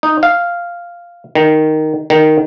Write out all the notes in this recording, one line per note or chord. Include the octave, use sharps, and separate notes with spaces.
D#4
F5
D#3
D#3